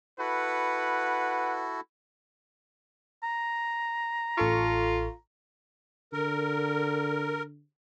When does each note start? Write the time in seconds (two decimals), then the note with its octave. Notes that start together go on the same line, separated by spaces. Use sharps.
0.19 E4 F#4 A4 B4 F#5
3.23 A#5
4.37 A1 F4 A4 C#6
6.13 D3 A#4